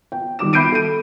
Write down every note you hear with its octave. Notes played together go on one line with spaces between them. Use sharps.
G5
D#3 G3 D6 E7
E5 B5 G6 C7 D7 D#7
A4 D#7